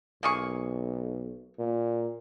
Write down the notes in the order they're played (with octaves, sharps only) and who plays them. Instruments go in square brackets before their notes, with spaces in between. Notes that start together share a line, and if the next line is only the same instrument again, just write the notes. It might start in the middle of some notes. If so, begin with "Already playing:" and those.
[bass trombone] B1 [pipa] A#3 G#4 C#6
[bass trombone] A#2